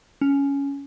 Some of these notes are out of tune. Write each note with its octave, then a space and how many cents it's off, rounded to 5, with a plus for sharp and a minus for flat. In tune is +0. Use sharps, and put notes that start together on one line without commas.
C#4 +10